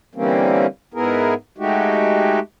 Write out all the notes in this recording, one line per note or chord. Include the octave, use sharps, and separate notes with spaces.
D3 E3 G3 A#3 C4 C#4
G#2 B3 E4 G#4 A#4
G#3 A3 D#4 F#4 G4